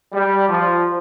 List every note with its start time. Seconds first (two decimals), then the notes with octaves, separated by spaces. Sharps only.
0.12 G3
0.47 F3